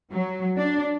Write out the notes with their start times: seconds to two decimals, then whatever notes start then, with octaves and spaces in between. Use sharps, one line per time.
0.11 F#3
0.57 D4